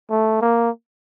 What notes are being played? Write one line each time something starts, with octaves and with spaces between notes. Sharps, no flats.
A3
A#3